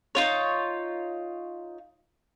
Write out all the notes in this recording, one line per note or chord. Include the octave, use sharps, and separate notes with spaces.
D#4 F4 C#5